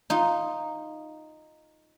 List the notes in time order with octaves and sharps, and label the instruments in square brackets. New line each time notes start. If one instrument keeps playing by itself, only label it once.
[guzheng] D#4 F4